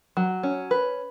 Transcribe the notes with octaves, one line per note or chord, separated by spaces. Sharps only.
F#3
C#4
B4